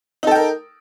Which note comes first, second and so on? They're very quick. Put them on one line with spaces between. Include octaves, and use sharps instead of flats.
D#4 A4 G5 A#4